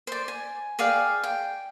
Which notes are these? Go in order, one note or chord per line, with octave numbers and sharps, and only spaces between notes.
C5 D5
G#5
G#4 D5 F5 G5
G5